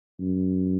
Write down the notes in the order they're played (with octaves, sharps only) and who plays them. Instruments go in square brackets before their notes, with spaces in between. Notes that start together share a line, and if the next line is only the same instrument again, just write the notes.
[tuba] F#2